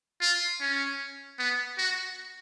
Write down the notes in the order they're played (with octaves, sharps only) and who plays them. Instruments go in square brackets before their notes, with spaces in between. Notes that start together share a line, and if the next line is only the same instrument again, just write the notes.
[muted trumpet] F4
C#4
B3
F#4